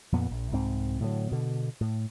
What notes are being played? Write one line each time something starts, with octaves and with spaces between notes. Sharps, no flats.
F2 A#2 B3
A#1
C2 G#2 C4
A2 D3 F#3
B2 D3
A2